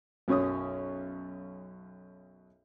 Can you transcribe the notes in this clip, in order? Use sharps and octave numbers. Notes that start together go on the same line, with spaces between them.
B1 F#2 C#4 C#5 D#6